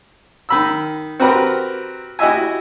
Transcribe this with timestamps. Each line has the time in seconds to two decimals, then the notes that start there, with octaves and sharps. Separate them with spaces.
0.49 D#3 B5 E6
1.20 C4 F#4 G4 A#4 B4
2.19 E4 F#4 G4 D#5 E5 G#5